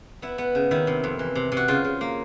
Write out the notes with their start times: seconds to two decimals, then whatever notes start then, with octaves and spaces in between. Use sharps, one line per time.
0.22 B3 E4
0.38 B3
0.55 C#3
0.71 D#3 E4
0.87 C3
1.04 F2
1.19 E3
1.35 C3
1.52 C3
1.57 F#4
1.68 C#3 F4
1.84 C#3
2.01 A#3